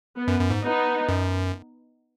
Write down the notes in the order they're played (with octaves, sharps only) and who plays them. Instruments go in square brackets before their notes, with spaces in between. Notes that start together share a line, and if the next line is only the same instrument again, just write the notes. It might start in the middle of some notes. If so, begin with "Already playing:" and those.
[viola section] B3
[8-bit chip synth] F#2
F#2
G#2
[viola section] B3 D#4
[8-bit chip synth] F#2